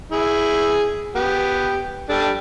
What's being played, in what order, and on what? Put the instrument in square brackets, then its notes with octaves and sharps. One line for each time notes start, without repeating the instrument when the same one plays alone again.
[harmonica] E4 G#4
B3 G4
G3 D4 A4